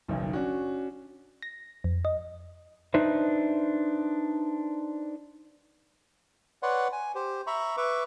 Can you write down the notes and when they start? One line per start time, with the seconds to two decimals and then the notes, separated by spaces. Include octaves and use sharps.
0.08 F#1 B1 D#3
0.33 C#4 D4 F#4
1.42 A#6
1.84 F2
2.05 D#5
2.94 D4 D#4 B4 C5 E5
6.63 B4 C#5 D5 F#5 C6
6.93 G#5
7.15 G4 C5
7.47 E5 A#5 B5 C#6
7.77 B4 E5 C#6 D6